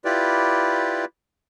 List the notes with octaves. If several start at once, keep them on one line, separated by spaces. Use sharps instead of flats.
E4 F4 G4 B4 D5